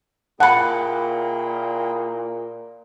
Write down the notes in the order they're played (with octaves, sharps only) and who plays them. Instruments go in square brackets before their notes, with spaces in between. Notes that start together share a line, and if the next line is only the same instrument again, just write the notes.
[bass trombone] A#2 [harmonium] E4 G#4 G5 [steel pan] F#5 [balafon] A5 B5